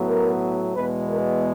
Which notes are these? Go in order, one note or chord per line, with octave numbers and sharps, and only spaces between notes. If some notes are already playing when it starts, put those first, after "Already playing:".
Already playing: A2 F#3 B3
A#4
E2 B2 G#3 B3 B4
A#4